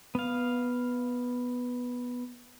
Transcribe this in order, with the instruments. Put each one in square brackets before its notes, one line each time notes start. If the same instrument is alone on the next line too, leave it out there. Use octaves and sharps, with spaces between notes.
[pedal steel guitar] B3 F5